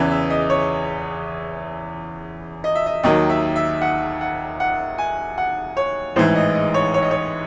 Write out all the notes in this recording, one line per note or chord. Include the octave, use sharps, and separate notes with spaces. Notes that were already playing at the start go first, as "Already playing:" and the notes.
Already playing: E2 C#3 E3
E5
D#5
C#5
D#5
E5
D#5
D#2 D#3 F#3 D#5
E5
E5
F#5
F#5
F#5
G#5
F#5
C#5
A1 G#2 E3 C5
D#5
D#5
C#5
C#5
D#5
C#5